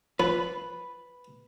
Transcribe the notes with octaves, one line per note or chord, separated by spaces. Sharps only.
F3 B4